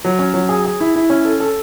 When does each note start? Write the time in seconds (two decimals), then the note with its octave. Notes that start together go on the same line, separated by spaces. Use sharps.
0.05 F#3
0.19 C#4
0.34 F#3
0.49 G#4
0.65 G#4
0.80 E4
0.96 E4
1.10 C#4
1.25 A4
1.40 A4